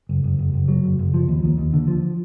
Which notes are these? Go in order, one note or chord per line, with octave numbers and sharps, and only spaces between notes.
F#1
F#1
F#1
F#1
F#3
F#1
F#1
F3
D#2
D#2
D#2
D3
F3